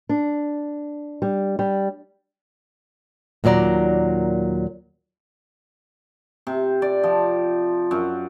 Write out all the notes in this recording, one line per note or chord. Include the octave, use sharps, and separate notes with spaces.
D4
G3
G3
D#2 A#2 F#3 D5 A#5
C3
D5
F3
F#2